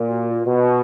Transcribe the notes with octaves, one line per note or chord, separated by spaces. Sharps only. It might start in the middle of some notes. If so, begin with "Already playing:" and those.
Already playing: A#2
F#4
F4
B2 F#4